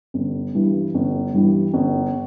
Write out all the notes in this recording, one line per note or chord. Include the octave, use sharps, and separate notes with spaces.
G1
G2 E3 G3
G1
G2 E3 G3
G1